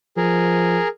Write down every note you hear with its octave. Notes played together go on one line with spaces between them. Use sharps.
F3 G#4 A#4